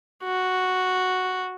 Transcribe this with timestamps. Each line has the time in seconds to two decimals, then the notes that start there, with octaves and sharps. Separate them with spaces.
0.24 F#4